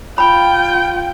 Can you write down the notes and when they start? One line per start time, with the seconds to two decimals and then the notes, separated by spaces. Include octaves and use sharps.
0.18 F4 G5 B5